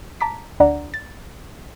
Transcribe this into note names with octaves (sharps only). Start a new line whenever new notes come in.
A5 A#5 D6 B6
D2 D4 D5 F#5 A#5
A6